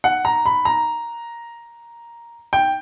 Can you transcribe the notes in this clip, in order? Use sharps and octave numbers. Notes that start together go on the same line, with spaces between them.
F#5
A#5
B5
A#5
G5